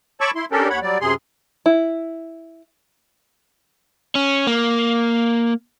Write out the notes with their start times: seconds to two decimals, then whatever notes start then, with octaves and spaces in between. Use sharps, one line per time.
0.21 C#5 A5 B5 C#6 D6 E6
0.35 E4 C6
0.51 C#4 D4 G4 A4 A#4
0.70 D#2 C#5 F#5 B5
0.82 F#3 G3 D5
1.01 F#2 C3 G#4 C6
1.66 E4
4.15 C#4
4.47 A#3